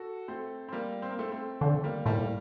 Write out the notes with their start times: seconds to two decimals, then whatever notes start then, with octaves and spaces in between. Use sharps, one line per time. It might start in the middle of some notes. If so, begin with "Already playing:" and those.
Already playing: F#4 A4
0.28 A3 C4
0.69 C4
0.72 G3 A#3
1.02 C4
1.10 A#3
1.19 A3 C4
1.32 A3 C4
1.61 D3 A3 C4
1.84 G3 A#3
2.06 A2 G3 A#3